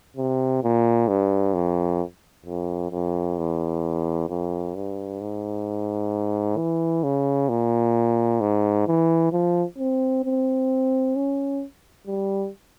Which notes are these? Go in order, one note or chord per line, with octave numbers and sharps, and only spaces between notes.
C3
A#2
G2
F2
F2
F2
E2
F2
G2
G#2
E3
C#3
A#2
G#2
E3
F3
C4
C4
C#4
G3